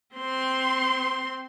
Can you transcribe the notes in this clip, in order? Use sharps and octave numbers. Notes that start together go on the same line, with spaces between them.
C4 C6